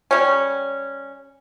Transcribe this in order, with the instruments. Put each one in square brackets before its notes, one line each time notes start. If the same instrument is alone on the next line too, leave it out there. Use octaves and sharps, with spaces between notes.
[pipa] G3 C#4